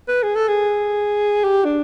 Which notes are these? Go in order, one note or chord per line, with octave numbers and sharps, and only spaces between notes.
B4
G#4
A4
G#4
G4
D4